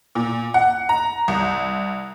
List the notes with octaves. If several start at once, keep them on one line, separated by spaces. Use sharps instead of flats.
A#2
F#5
A#5
C2